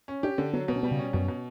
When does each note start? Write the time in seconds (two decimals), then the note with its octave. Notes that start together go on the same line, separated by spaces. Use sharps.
0.08 C#4
0.23 D4 G4
0.38 D3 C#4
0.53 F#3 B3
0.68 B2 B3
0.76 C#4
0.83 G3 B3
0.91 C#3
0.99 C#4
1.13 F#2 B2
1.28 B2